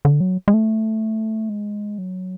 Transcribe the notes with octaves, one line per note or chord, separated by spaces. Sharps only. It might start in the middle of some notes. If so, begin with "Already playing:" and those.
D3
F#3
G#3
A3
G#3
F#3